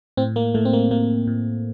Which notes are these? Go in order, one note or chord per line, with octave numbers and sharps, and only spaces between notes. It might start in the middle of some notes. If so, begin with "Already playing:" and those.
A2 C4
A#3
A2 A3
C4
A#3
A2 A#3
A2